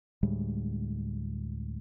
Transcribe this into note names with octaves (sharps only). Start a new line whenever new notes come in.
D2 A2 G3 G#3